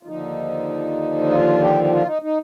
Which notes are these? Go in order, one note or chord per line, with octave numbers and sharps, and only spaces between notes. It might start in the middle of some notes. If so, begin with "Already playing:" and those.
F4
D#2 D3 F3 D#4
F4
G4
G4
F4
D#4
D#4